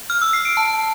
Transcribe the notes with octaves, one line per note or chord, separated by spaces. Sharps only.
F6
E6
C7
D7
A5